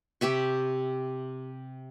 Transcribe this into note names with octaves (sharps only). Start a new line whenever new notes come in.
C3 G4 E5 C#6